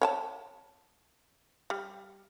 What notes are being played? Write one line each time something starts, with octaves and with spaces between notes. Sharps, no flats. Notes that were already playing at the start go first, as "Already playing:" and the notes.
C#5 G5 A5
G3